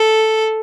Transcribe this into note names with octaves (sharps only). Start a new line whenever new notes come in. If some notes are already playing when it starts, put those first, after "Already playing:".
Already playing: A4